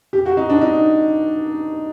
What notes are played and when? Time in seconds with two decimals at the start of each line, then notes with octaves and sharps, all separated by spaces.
0.13 G4
0.26 F#4
0.37 D#4
0.50 D4
0.61 D#4